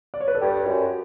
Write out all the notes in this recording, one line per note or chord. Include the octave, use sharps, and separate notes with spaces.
D5
C#5
B4
A4
G2 G4
F#2